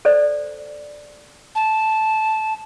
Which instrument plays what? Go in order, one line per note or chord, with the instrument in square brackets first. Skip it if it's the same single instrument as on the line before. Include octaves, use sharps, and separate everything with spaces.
[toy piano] A4 C5 D5
[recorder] A5